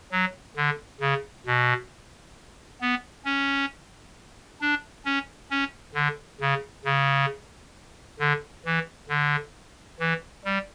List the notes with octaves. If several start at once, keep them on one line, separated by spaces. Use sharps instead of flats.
F#3
D3
C#3
B2
B3
C#4
D4
C#4
C#4
D3
C#3
C#3
D3
E3
D3
E3
G3